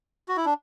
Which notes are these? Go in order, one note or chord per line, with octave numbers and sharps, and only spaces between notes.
F#4
E4
D4